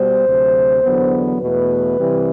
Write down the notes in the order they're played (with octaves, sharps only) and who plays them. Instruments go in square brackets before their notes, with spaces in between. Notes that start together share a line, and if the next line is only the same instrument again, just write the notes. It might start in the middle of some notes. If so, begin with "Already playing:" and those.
Already playing: [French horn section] B2 G3 B3 C5
D2 C3 F#3
E2 D3 F#3 B3
E2 B2 A3 B4
C3 E3 G3 C4